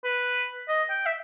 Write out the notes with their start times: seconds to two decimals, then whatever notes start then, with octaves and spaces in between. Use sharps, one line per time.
0.04 B4
0.68 D#5
0.90 G5
1.06 E5